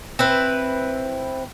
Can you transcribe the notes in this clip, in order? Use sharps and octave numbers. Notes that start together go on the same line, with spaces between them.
C4 E4 B4